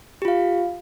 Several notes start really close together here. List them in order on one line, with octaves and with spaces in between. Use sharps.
G4 F4 F5